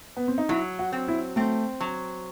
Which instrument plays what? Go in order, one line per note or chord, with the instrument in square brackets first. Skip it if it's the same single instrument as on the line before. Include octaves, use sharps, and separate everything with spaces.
[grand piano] B3
C4
D#4
[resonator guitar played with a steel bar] F#3 [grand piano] E4
[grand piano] F#4
[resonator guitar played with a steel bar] C4
[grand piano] E4
[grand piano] A3 [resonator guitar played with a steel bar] C4
[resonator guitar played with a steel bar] F#3